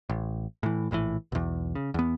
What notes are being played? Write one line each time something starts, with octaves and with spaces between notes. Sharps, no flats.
A1
A2 E3
A#1 A2 D#3 E3
B1 E2
C#3
E2 B3